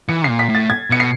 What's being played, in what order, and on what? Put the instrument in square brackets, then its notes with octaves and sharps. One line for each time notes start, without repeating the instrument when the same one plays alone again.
[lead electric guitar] E3 [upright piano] C#7
[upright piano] C7
[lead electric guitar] A#2
[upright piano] B6
[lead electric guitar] A2
[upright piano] A6
G#6
[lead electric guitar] B2 [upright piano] C#7
[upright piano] C7